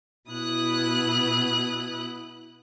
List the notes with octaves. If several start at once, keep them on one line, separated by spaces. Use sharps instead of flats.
B2 E4 D#6 F#6